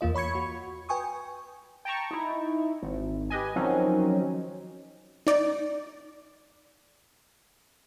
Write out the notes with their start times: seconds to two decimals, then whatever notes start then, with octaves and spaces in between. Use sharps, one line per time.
0.01 E2 A#3 F4 D#5
0.14 C#5 B5 C#6 G#6 C#7
0.35 F#4
0.89 B4 G5 G#5 C#6 D#6
1.85 G5 A5 A#5 C#6
2.11 D#4 E4
2.83 G#1
3.30 G4 B4 D#5 G#5
3.56 D#3 F3 F#3 C4 C#4 D#4
5.27 D#4 D5